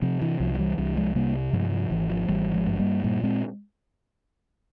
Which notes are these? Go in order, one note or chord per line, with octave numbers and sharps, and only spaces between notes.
C3 F3
E3
C2 F3
F3
E3 G3
C2 E3 G3
F3 G#3
C3 G3 A#3
G2 F3 G#3
F3
G#1 E3
F3
G#1 E3 G3
F3 G#3
G2
G3 A#3
A#2 G3 A#3
G#3 C4